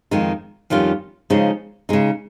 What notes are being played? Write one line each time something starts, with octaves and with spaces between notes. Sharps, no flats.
F2 D#3 G#3 D#4
F2 D#3 G3 C#4 F4
C#3 F3 G#3 D#4
C#3 G#3 D#4